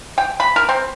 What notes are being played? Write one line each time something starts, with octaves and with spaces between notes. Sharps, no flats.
G5
B5
A#4
C4